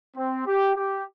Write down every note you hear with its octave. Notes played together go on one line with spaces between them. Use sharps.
C4
G4
G4